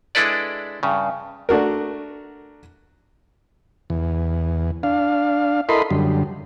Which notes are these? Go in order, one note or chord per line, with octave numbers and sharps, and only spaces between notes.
G#3 D4 E4 A4 B4 D5
G2 C#3
A3 D4 F#4 A#4
E2
D4 F5
E4 A4 A#4 D#5 B5 C6
F#2 D3 G3